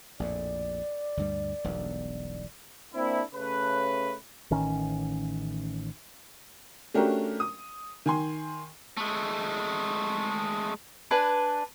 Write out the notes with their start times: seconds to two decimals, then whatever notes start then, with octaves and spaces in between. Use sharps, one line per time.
0.20 A#1 F2 A2 D5
1.17 D2 G2 G3
1.64 E1 B1 G2
2.94 A#3 C4 D4 E4
3.34 C#3 A3 B4
4.51 A1 D#3 C#4
6.94 A3 C#4 D4 F#4 G4 A#4
7.40 D#6
8.06 D#3 G#5 C6
8.97 G#3 A3
11.11 D4 B4 G#5